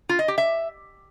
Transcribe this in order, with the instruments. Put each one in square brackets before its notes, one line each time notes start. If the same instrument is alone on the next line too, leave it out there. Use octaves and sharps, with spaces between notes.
[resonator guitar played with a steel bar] F4
D#5
G4
E5